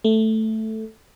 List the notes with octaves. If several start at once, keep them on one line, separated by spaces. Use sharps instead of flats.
A3